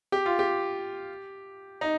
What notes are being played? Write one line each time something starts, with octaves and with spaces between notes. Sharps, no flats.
G4
F4
G4
D#4